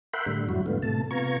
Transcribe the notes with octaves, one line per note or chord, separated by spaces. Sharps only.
A#4 E5 F#5 G5 B5 C6
A2 D3 G3
F2 G#2 F#3 G3 E4 F#4
G#2 D3 G3 A3 B3 F4
A2 C3 A3 A5
C3 B3 F4 A#5 C#6 G#6